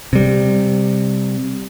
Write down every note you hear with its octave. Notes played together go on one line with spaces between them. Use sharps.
C3 G3